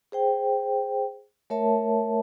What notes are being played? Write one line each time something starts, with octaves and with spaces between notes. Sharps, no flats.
G#4 C5 G5
A3 A#4 C#5 E5 A5